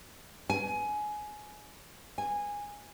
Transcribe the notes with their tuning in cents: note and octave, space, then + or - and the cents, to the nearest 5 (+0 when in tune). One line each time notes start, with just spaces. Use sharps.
G#5 +20
G#5 -15